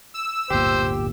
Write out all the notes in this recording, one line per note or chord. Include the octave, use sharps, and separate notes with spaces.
E6
D1 G1 A#2 G4 C5